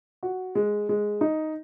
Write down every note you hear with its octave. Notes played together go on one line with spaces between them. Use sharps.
F#4
G#3
G#3
D#4